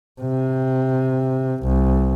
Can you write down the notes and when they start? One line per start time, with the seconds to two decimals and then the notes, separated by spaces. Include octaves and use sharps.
0.22 C3
1.63 C2